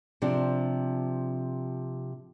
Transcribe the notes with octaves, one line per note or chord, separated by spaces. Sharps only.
C3 F3 D4 G4